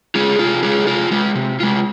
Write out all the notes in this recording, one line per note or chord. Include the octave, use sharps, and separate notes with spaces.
G#3 F4 G#4
C3 F4
G#3 F4 G#4
C3 F4
G#3 F4
C3
G#3 F4